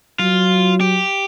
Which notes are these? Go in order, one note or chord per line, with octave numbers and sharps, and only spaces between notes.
F#3 F4
G4